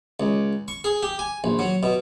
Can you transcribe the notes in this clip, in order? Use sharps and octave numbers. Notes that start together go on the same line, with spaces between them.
C#2
C#6
G#4
G4
G#5
A#1
F#3
B2